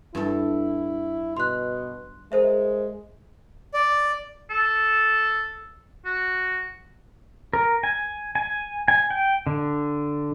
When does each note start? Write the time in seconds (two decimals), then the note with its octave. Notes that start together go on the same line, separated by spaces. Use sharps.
0.15 G2 E4 A4
1.37 B2 C6 F#6
2.32 G#3 A#4 C5 E5
3.74 D5
4.50 A4
6.05 F#4
7.53 A#4
7.83 G#5
8.35 G#5
8.88 G#5
9.10 G5
9.47 D3